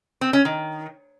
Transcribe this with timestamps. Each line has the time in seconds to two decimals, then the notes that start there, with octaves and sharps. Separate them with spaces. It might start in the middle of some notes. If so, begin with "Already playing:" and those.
0.21 C4
0.33 C#4
0.45 D#3